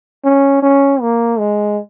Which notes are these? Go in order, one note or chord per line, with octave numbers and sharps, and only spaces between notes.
C#4
C#4
A#3
G#3